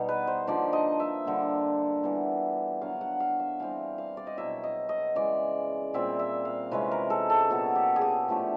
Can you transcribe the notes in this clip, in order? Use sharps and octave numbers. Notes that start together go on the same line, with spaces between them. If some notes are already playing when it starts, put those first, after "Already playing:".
Already playing: B2 G3 B3 D#4
B4
C5
D3 F3 A#3 D#4 D5
D#5
E5
D3 G3 A#3
E3 G3 B3
D3 F#3 B3 F5
F#5
F5
E5
E3 G3 C4 F5
F5
D5
D#5
B2 F#3 B3 E4 E5
D#5
D#5
C#3 E3 G#3 D5
A#2 G3 C4 E5
E5
F5
C3 E3 G#3 C#4 B4
A#4
A4
A4
A#2 F#3 B3 A4
G4
G#4
G4
A2 F3 A3 D4